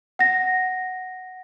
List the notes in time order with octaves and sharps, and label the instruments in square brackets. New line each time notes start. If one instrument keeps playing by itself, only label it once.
[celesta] F#5 A#6